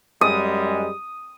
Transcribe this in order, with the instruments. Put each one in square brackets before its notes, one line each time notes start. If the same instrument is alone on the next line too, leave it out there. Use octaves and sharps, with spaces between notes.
[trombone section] F#2 G3 G#3 [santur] D#6